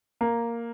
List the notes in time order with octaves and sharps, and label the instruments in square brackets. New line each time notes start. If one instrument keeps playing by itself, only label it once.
[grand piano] A#3